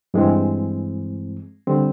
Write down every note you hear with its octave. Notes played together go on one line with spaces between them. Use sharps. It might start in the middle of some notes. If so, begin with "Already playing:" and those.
G2 E3 G#3 C4
D3 G3 C4